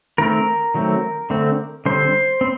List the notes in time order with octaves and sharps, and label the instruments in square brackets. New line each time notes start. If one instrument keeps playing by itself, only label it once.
[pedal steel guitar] D#3 A3 C4 A#4
D#3 F#3 A3 C4
D3 A3 C4
D3 G3 C4 C5
C4